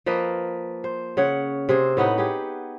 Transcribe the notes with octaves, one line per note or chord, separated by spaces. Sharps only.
F3 A#3 B4 D#5
C5
C#3 C#5 F#5
C3 G#4 C5
A2 B3 D#4 F#5
G4 G#4 F#5